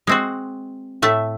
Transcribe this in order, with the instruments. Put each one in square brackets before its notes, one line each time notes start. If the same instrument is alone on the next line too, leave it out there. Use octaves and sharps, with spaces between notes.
[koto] G#3 C4 F#4
A2 A3 E5 A5